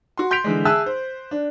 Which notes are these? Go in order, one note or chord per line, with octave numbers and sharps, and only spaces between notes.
F#4 C6
C6 G6 B6 D7 F7
D3 E3 G#3
G#4 E5 G#5 A5 E6 F#6
C5
D4